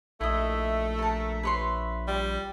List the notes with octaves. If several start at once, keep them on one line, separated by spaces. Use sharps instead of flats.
A#1 A3 E4 D#5 E5
A#4 A5
B4 C#5 C6
G3